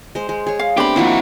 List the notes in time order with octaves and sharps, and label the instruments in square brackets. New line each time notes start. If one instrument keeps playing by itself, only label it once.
[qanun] G#3 C5
G#3
G#4 C#5
[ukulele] F5
[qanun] A3 B3 C4 [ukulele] D4 B5 [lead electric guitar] G4
[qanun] F3 A#3 E4 [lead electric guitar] C4 F#4